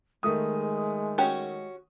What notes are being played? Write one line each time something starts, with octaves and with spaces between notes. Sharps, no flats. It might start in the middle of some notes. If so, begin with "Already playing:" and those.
D#3 G#3 A3 D#6
C#4 F#4 G4